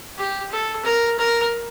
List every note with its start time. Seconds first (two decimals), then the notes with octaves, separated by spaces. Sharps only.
0.18 G4
0.52 A4
0.85 A#4
1.19 A#4